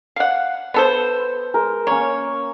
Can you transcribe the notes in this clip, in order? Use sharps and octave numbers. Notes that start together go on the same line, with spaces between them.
F5 F#5
B3 A4 C5
G#3 A#4
A#3 C#4 C#5